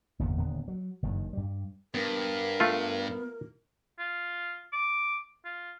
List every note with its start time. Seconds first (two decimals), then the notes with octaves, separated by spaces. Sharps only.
0.19 G1 E2 A#2 C#3
0.38 D#1 D3 B3
0.68 F#3
1.03 F#1 G2 D#3
1.33 G2 G3
1.94 G2 B3 A#4
2.60 A3 F4
3.99 F4
4.73 D6
5.45 F4